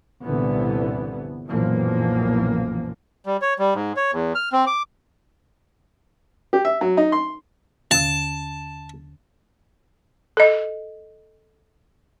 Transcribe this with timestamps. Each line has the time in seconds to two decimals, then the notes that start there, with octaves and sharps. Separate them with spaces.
0.23 G1 C2 A#2 D3 E3 B3
1.49 B1 F#2 A#2 E3 F3 A#3
3.26 G3
3.42 C#5
3.59 G3
3.74 G#2
3.96 C#5
4.12 E2
4.35 F6
4.52 C4
4.67 D6
6.53 G4
6.65 E5
6.81 F#3
6.97 D#4
7.12 C6
7.91 D#2 D3 A5
10.37 A4 D#5